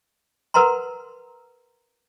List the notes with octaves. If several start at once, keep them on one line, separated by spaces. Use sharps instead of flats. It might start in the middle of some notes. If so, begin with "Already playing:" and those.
A#4 B4 F#5 A#5 C6